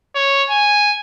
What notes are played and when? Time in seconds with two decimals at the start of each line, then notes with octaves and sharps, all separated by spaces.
0.16 C#5
0.50 G#5